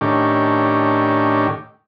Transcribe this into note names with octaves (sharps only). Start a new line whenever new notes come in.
A2 D#3 C#4 D4 G4